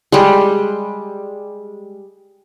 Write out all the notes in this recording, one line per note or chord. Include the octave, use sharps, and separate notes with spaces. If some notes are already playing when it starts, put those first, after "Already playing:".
G3 G#3